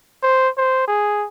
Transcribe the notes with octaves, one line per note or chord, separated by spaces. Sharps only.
C5
C5
G#4